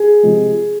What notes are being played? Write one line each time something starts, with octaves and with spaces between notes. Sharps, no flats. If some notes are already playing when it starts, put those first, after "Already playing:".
Already playing: G#4
C3 F3 G#3